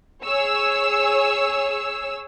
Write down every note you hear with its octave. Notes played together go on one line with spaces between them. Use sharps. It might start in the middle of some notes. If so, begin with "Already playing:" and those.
G#4 C#5 E6